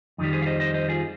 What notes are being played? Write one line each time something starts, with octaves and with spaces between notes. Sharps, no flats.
F2 D#3 G3 D#4
G#4 C5
F5
C5 D#5
C5 D#5
C5 D#5
F4 G#4